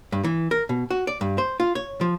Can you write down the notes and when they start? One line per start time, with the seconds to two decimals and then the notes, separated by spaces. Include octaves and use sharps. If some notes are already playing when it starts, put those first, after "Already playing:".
0.12 G2
0.24 E3
0.51 A#4
0.69 B2
0.90 F#4
1.07 D5
1.21 G2
1.38 C5
1.60 F4
1.75 C#5
2.01 F3